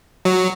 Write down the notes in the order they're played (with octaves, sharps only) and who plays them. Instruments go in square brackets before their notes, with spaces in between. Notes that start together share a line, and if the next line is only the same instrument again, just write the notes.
[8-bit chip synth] F#3